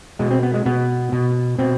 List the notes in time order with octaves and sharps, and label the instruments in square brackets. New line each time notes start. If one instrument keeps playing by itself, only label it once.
[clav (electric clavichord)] B2 G#3
C4
B3
G#3
B2 B3
B2
B2 C4